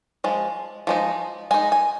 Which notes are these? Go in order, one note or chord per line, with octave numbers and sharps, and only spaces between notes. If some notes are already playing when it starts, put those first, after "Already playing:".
F3 G#3
F3 G#3 D#4
G#3 D#4 G#5
G#5